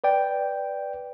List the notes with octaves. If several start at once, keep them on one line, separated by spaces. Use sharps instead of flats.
B4 D5 G5